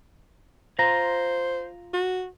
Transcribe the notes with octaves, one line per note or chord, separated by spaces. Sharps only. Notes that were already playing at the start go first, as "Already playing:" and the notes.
F4 C5 A#5
F#4